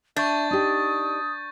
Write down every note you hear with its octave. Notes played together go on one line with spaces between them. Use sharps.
D4 E5 C#6 G6 A6
D#4 G4 D#6